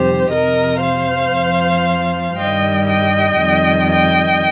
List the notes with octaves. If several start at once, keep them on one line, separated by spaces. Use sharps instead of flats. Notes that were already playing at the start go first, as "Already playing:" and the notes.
Already playing: F2 C3 D#3 G3 G4 C5
F2 C3 F3 A#4 D#5
C5 F5
F2 F3
G2 D#3 G3 D#5 G5
D#5 G5
F2 D#3 G3
D#5 G5